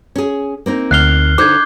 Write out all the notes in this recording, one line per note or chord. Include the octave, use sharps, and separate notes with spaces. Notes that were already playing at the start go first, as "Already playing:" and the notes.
C#4 G#4
A#3 C4 D#4
D2 F6 F#6 C7 G7
D3 D#4 C5 D6 G6 G#6